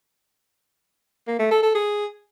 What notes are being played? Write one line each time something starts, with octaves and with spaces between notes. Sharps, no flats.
A#3
A3
A4
A4
G#4